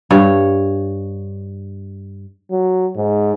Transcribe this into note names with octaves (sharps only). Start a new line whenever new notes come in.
G2 C#5 F#5
F#3
G#2